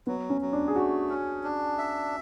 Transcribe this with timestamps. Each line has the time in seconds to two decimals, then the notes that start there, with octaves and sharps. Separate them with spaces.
0.07 F#3 B3
0.30 C#4
0.41 F#3
0.53 D4
0.68 G#4
0.76 A3 F#4
1.09 C#4
1.44 D4
1.78 E5